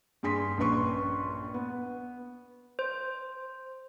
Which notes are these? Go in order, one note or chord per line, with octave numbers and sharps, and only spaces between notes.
G2 G#4 C6 B6
A#1 G2 C#4 B4 C6 C#6
B3
C5